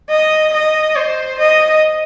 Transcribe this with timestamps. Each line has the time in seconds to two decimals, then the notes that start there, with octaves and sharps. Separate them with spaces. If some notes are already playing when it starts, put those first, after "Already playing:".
0.10 D#5
0.54 D#5
0.96 C5
1.39 D#5